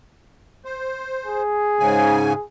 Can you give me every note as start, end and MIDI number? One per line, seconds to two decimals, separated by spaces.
0.65 1.42 72
1.26 2.45 68
1.79 2.33 44
1.79 2.33 49
1.79 2.33 80